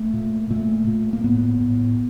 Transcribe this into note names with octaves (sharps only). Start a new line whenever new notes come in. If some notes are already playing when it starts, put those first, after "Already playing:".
Already playing: A3
A#2
A#2 A3
A#2
A#3
A2 B3
A2